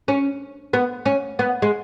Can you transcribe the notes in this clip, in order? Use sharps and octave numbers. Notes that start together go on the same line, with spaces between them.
C#4
B3
C#4
B3
G#3